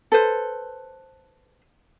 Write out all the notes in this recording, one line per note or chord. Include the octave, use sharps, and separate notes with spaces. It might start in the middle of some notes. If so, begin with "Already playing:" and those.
A4 B4 C5